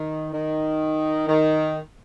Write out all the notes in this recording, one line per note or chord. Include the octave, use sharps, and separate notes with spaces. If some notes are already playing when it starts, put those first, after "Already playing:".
Already playing: D#3
D#3
D#3